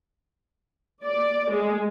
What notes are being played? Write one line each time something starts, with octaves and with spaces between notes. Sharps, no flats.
D5
G#3